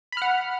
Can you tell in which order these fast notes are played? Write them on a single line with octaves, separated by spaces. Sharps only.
B5 F6 F#5